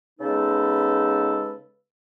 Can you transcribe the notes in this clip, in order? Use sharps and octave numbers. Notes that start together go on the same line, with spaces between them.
C#3 G#3 B3 D#4 A4 B4